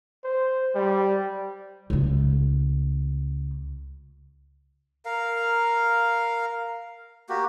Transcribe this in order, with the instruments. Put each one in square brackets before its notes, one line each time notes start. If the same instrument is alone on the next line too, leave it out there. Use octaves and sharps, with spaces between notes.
[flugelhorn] C5
G3
[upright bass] C#2 A3
[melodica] A#4 F5
A#3 F#4 G4